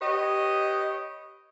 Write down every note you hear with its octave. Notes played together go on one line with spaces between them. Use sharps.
G4 B4 C#5 D#5